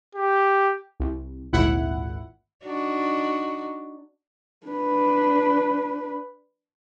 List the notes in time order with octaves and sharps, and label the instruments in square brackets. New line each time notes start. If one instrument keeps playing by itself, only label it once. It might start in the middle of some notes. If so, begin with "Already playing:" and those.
[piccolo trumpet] G4
[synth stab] C2
G#1 D2 A#2 E4 F#5
[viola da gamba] D4 D#4 F#4
[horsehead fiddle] D4 B4